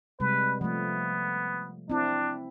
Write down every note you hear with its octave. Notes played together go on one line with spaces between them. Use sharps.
C3 G3 G#3 B4
F3 A3 B3
C4 D4 E4